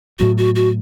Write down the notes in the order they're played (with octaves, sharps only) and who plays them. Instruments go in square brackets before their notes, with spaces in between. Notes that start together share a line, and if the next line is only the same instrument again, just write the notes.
[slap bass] A2 F#3 B3 [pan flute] F#4
[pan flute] F#4
F#4